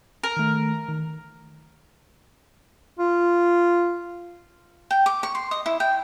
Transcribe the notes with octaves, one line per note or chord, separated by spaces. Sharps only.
A#4
D#3 A3
D#3
F4
G5
D6
C#6
C6
D#5
E4
G5